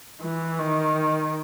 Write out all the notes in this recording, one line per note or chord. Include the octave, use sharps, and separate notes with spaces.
E3
D#3